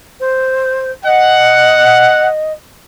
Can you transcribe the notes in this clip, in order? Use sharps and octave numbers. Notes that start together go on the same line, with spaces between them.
C5
D#5 F#5